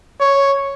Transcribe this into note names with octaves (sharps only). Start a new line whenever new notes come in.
C#5